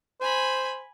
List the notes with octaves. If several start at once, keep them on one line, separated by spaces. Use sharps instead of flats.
C5 G#5 B5